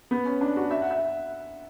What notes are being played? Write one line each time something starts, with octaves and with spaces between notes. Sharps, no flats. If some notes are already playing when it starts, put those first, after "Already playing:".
B3
C#4
D4
F#4
E5
F#5
E5